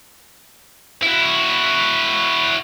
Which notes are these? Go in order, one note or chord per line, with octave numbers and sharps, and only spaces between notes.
E4 F#4